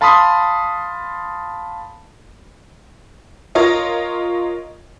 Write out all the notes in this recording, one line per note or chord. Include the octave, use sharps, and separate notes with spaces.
F5 A5 B5 C6 D#6 B6
F4 A#4 C#5 D#5